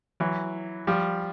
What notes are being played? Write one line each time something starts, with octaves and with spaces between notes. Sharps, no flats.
E3 F#3
F3 G3